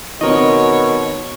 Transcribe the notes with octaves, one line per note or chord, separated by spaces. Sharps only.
B2 D#3 C4 A#4 C#5 D#5